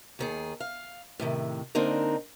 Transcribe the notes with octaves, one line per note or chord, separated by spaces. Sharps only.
D#2 D#3 G#4
F5
A2 C3 D#3
D3 A#3 C4 D4 D#4 A#4